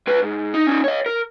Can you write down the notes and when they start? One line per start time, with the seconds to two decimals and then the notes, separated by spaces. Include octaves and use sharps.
0.07 C#2 B4
0.22 G#2
0.54 D#4
0.67 C#4 D#4
0.84 C#5 D#5
1.06 A#4